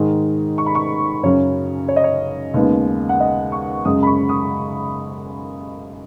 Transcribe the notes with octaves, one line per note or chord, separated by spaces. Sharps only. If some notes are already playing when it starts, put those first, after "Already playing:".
Already playing: G#2 D#3 G#3 D#4
C#6
B5
C#6
F#2 C#3 F#3 C#4 C#5
C#5
D#5
C#5
D#2 C#3 G#3 B3
F#5
D#5
C#6
F#2 C#3 G#3 D#6
B5
C#6
D#6